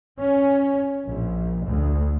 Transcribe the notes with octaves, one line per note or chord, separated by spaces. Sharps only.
C#4
A#1
D2